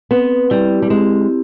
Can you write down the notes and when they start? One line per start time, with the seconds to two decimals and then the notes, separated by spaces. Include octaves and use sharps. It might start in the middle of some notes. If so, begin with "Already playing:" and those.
0.11 B3 C4
0.50 G3 E4 G4
0.82 G3
0.90 G#3 C4